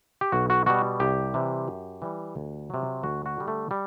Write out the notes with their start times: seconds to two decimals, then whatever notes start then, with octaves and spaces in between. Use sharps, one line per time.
0.21 G4
0.32 B1 F#4
0.50 F#4
0.66 B2 G3 F#4
1.00 C2 G4
1.34 C3 E3 G3
1.68 F#2
2.02 E3 G3
2.36 D2
2.70 C3 F#3
3.03 D2 F#4
3.26 F#4
3.37 D3 G3
3.48 A3
3.71 G3